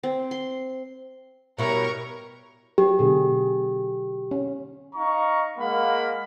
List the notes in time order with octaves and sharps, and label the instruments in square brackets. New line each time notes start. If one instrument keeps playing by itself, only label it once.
[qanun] C4
C6
[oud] B2 E4 [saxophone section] G3 B4 C#5 [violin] A#4 [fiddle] A#5 C#6
[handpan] F#3 [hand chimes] G4
[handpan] B2 D3 G#4
C#4
[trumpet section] D#4 F5 A#5 C#6
G#3 A#3 F5 F#5 B5